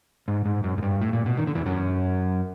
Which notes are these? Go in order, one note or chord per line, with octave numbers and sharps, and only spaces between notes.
G#2
G#2
F#2
G#2
G2
A2
A#2
B2
D#3
D3
E2 E3
F#2 F#3